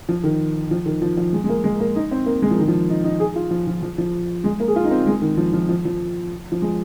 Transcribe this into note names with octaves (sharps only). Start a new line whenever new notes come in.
F3
D#3
F3
D#3
F3
F3
G#3
G#3
A#3
G#3
A#3
D#4
C4
A#3
G#3
F3
D#3
F3
D#4
D#4
G#4
F4
F3
F3
F3
F3
G#3
A#3
G#4
F4
D#4
C4
G#3
D#3
F3
F3
F3
F3
F3
G#3